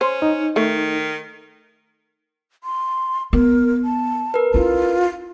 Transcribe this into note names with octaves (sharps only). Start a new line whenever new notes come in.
C#4 C5
D#4
D#3 A3
C6
B3 A#4
A5
A#4 B4
C#4 E4 F4